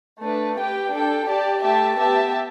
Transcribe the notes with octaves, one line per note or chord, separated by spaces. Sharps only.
A3 D4 B4
G4 B4 G5
D4 A4 G5
G4 D5 A5
A3 G4 E5 A5
B3 G4 E5 A5